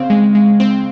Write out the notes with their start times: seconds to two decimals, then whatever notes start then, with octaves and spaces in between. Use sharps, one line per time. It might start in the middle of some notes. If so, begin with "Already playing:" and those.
Already playing: C#3 C4 F5
0.10 G#3
0.35 G#3
0.60 C4